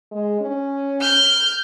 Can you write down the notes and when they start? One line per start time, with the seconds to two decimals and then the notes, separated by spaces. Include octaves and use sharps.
0.11 G#3
0.41 C#4
1.01 F6 G6